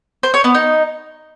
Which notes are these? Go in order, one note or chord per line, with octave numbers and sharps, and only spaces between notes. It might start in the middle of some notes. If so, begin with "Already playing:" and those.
C5
C#5
B3
D#4